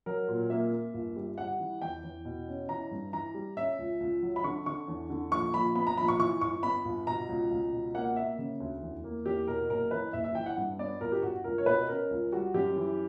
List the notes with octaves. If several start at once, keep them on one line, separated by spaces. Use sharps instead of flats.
F#3 A#4
A#2
A#3 E5
A#3
G1
G3
G3 F#5
E3
E2 G5
E2
B2
C#4
E3 A#5
G2
E3 A#5
G3
C#4 E5
C#2
C#2
F#3
B5
D3 C#6
D3 C#6
E2
D3
A#1 C#6
A#1 B5
B3 B5
A#5
A#1 B5
C#6
E3 C#6
G1 C#6
B3 B5
G1
B2 A#5
C#2
C#2
B2
A#3 F#5
A#3 E5
C#3
D2
E2
A#3
E2 G4
B2 A#4
F#1 A#4
E3 B4
F#1 E5
E5
E3 G5
F#5
G2
B3 D5
G1 A#4
G4
G1 F#4
C#2 A#4
C#5
B2 B4
C#4 A#4
C#2
G3 F#4
F#2 G4
E3